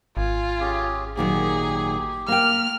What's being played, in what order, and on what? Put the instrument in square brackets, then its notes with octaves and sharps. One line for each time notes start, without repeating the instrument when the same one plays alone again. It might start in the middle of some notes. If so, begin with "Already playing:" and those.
[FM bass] G#1 [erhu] F4 [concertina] G#5
[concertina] C#4 G4 G#4
[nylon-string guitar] A#2 D#3 F#3 [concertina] G4 [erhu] G#4
[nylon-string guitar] A#3 G5 [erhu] F6